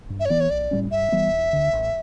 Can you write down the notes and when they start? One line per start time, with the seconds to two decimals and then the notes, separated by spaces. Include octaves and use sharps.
0.10 G2
0.20 E5
0.25 C#5
0.30 E3 B3 D5
0.40 C#5
0.50 B1 D5
0.71 A2 G3 C#4
0.91 G2 E5
1.12 E3 G3 B3
1.32 E1
1.53 D2 D3
1.73 A1